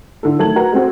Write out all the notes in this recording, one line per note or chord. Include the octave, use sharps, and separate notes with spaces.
D3 E4 A4
D#3 F#3 A3 A5 G#6 F#7
F#4 A#4 B4 F#5 A#5
G#3 A3 C4 F#4